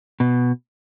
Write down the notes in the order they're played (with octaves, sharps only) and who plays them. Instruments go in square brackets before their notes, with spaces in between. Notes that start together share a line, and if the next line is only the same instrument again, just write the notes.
[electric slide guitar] B2